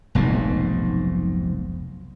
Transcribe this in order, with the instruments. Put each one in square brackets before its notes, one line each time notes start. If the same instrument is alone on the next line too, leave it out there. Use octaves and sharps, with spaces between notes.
[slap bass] F1 B1 G#2